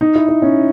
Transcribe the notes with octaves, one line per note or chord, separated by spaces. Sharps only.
D#4
E4
E4
C#4